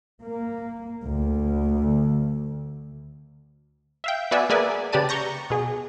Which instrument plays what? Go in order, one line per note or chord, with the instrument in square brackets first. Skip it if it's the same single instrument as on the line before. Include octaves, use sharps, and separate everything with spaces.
[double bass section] A#3
D2
[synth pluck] E5 F5 G5
B3 F#4 D5 E5 G#5
A#3 G#4 B4 D5 E5 G#5
C#3 G4 B4 D5 A5 D#7
A#5 C#6 G6 A#6
B2 G#4